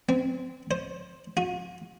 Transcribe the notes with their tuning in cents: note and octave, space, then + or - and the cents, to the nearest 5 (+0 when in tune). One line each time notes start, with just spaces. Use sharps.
C4 -30
C5 +15
F#4 -45